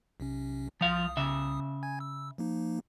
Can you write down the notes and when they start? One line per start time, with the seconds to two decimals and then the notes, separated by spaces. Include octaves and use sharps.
0.20 B1 C3 C#4
0.81 C2 F3 F5 D#6
1.17 C#3 E5
1.83 G#5 G#6
2.00 E6
2.38 F3 A#3 D#4